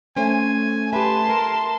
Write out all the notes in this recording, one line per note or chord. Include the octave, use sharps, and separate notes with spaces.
A3 C#4 C5 G#5
G4 B4 E5 A5 C6
A#4 E5